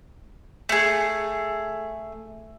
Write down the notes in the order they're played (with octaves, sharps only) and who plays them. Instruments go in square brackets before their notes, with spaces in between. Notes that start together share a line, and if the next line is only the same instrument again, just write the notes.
[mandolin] A3 G#4